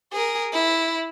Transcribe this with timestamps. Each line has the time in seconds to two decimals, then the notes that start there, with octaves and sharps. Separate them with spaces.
0.13 G#4 A#4
0.53 E4